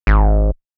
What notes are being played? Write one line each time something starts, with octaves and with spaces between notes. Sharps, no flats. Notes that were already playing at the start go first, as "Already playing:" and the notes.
G#1